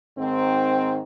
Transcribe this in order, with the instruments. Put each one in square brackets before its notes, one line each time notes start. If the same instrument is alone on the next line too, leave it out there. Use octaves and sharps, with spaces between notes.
[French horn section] G#2 D#3 C4